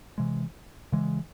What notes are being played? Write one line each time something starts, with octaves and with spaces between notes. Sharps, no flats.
C3 E3 G#3
C#3 E3 G#3